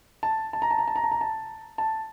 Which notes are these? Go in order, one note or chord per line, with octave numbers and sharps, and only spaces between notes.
A5
A5
A#5
A5
A#5
A5
A#5
A5
A#5
A5
A5